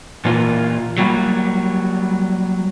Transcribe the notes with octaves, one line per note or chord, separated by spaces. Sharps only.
A#2 E3 A#3 F4
F#3 G3 A#3